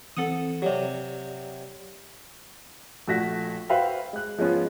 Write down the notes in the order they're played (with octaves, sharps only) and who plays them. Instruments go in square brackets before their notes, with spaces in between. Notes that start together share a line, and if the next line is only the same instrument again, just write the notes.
[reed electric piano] E3 C4 [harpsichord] A4 F#5 D#6
[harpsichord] C3 F#3 [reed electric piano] G4 D5
[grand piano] A#1 A3 F#4 A#6 B6
F#4 B4 C5 E5 F5 G5
G#3 F#6
F3 G#3 B3 C#4 F4